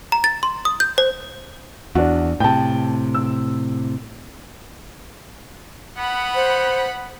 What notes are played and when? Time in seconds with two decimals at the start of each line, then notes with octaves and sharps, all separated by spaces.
0.12 A#5
0.24 A6
0.43 C6
0.65 D#6
0.80 G6
0.98 C5
1.95 E2 D4 F#4
2.40 A2 C3 G5 A5
3.15 E6
5.98 B3 F#5 B5
6.35 C5